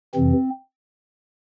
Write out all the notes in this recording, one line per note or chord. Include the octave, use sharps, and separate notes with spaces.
F2 C3 E3 C4